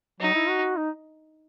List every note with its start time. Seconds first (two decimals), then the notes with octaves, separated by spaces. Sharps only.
0.20 F#3 D#4
0.34 E4
0.49 F#4
0.77 D#4